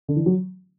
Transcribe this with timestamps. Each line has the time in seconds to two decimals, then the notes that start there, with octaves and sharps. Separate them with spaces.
0.08 D3
0.16 E3
0.26 F#3